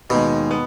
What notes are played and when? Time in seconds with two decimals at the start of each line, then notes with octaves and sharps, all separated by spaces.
0.10 D#2 B2 D#3 G#3
0.51 B3